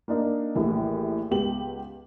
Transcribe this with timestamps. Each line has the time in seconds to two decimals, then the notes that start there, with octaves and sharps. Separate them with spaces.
0.08 A#3 D4 D#4
0.55 A#1 D#2 A2 E3
1.31 C#2 B3 G4 F#7